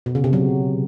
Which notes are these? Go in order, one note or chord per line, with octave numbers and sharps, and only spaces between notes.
B2
C#3
C3
F#3